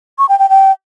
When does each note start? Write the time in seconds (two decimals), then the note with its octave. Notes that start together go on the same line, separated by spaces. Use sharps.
0.19 C#6
0.29 G5
0.39 G5
0.49 G5